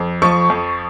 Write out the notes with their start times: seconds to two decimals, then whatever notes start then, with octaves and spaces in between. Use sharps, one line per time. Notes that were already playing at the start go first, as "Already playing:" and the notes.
Already playing: F2
0.22 F3 C#6
0.50 F2